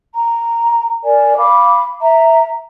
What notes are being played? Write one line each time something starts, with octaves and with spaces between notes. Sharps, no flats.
A#5
A#4 D5 G#5
F5 B5 D6
E5 A#5